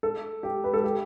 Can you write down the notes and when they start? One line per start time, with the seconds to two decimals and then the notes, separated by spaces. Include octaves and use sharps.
0.03 A4
0.43 G4
0.64 B4
0.74 A4
0.84 G4